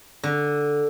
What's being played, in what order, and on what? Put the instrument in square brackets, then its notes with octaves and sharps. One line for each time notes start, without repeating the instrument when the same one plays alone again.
[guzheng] D3